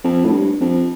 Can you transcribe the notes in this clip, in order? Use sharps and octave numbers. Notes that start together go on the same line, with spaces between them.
F2
A2
G2
F2